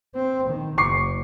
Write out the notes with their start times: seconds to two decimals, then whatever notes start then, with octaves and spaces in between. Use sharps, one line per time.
0.15 C4
0.49 D#3
0.78 F#1 C#6 D6 C7